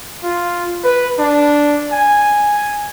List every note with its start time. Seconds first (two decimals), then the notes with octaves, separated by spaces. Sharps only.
0.24 F4
0.84 B4
1.19 D4
1.93 G#5